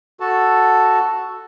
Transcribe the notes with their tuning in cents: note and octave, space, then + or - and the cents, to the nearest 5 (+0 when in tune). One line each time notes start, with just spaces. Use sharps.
F#4 +0 A4 +0 A5 +0